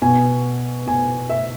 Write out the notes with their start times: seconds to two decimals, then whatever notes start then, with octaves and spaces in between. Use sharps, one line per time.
0.02 B2 G#5
0.86 B2 G#5
1.29 E5